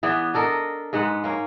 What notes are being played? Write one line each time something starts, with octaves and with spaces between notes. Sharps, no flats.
E3 B3 G#4 D5
D4 A4 A#4 D#5
G#2 G#3 B4 F#5
A#3 C#4